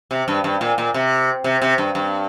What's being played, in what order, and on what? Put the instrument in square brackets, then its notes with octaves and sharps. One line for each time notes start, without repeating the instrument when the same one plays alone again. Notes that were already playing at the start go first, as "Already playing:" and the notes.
[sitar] C3
G2
G2
A#2
A#2
C3
C3
C3
G2
G2